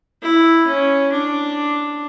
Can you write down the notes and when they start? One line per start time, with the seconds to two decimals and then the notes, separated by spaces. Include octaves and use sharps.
0.22 E4
0.67 C#4
1.12 D4